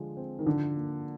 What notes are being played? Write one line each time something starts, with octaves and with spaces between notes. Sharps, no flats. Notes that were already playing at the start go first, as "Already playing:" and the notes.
Already playing: D3 F3 G#3
C4
D#3
D3 F3
A#3